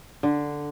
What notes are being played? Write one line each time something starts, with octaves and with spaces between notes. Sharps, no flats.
D3